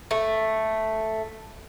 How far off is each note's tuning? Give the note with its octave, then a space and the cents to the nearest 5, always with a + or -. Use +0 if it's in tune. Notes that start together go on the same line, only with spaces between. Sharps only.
A3 +0